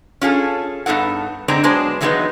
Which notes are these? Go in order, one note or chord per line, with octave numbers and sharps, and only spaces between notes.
C#4 F4 G#4 A4
G2 B3 D#4 A4 F#5
D3 G#3 C4 D4 D#4 A#5
F#3 G#3 B3 D4 G#4 C5
D#3 E3 F#3 G#3 B3 D#4